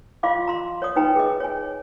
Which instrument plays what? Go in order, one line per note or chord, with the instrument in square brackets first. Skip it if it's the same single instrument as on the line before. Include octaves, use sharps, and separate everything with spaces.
[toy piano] F4 D5 D#5 F5 C6 D6
A#5 C6
C#5 D5 D#6
D#4 B4 G5 G#5 A#5
G#4 D#5
C#5 G#5